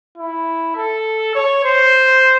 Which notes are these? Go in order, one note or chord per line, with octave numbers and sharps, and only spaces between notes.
E4
A4
C#5
C5